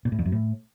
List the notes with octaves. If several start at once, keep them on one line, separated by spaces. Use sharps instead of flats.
A#2
A2
F2
F#2
A2